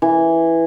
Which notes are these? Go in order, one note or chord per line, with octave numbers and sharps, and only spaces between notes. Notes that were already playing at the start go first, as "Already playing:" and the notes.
E3